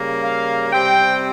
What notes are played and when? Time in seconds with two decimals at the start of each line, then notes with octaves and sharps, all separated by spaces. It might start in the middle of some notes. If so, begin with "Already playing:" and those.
Already playing: C#3 G3 A#3
0.22 F5
0.73 C3 G3 C4 G5